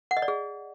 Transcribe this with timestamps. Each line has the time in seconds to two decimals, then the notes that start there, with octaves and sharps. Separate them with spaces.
0.11 F#5
0.17 D#5
0.22 D5
0.28 G#4